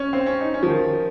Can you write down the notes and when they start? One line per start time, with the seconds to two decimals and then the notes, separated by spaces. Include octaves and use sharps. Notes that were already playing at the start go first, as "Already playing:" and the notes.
Already playing: C#4
0.13 C4
0.26 C#4
0.41 D#4
0.54 C#4
0.63 F3
0.68 D#3